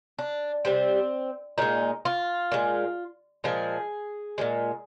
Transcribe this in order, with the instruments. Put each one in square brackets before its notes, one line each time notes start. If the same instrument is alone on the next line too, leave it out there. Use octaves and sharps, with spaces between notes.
[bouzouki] D4
C3 G3 C4
A#2 G#3 D#4
F4
A#2 G#3
A#2 F3 G#3 G#4
A#2 F3 G#3